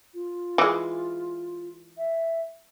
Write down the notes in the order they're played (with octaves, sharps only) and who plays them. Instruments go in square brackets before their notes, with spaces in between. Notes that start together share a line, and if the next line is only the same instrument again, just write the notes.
[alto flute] F4
[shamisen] E3 G#3
[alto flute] E5